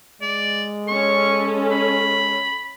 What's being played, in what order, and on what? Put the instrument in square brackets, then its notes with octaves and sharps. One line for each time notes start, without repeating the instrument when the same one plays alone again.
[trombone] G#3 [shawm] D5
[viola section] C#4 A4 [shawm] C#6
[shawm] B5